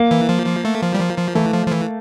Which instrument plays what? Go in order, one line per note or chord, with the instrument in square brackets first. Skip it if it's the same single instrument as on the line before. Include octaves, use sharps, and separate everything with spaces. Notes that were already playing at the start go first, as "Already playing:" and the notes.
Already playing: [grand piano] A#3
[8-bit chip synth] E3
F3
F3
A3
F3
G3
F3
F3
[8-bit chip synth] E3 [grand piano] A3
[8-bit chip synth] F3
F3
E3